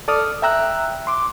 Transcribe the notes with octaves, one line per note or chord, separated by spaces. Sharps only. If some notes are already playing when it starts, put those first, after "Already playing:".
A4 D5 D#6 F6
E5 G5 A#5 E6 F#6
C6 D6